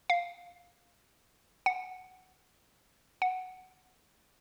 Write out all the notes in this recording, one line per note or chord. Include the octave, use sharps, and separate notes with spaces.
F5
F#5
F#5